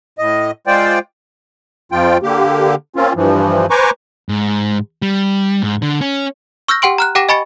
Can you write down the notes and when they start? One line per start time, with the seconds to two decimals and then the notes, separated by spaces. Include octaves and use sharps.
0.19 A2 D#5
0.67 G#3 F4 C5 D5 G5
1.92 F2 F3 F4 G5
2.23 D3 A#3 G4
2.96 A#3 C4 C#4 F4
3.16 G2 E3 F3
3.70 B4 C5 G#5 A#5 C#6 D6
4.29 G#2
5.02 G3
5.63 G#2
5.82 D3
6.01 C#4
6.68 C#6 E6 F6 G6 A#6
6.82 G4 F#5 G5 C6 D7
6.98 A#5 F6 F#6
7.15 G4 F#5 G5 D6 A#6 E7
7.29 D#5 G#5 B5 C#6 A6 C#7